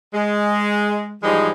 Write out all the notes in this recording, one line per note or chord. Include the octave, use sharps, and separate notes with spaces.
G#3
G#2 E3 F3 G3 G#3 D#4